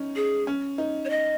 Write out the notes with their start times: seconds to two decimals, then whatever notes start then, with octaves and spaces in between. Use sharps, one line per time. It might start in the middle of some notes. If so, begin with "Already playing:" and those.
Already playing: C#4 D#4
0.16 G#4
0.47 C#4
0.78 D#4
1.05 C#5
1.10 D#5